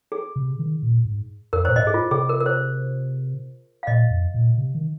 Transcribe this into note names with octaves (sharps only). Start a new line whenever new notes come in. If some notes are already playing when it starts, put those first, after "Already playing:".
G#4
C3
D#3
A#2
G#2
F2 A#4
A#2 C5
G#2 D#5
G#4
F4
C3 G#4
A#4
A#4
C5
F5
A#2 D#5
F2
A#2
C3
D#3